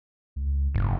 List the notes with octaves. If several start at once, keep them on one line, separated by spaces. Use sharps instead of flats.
C#2
F#1 G#2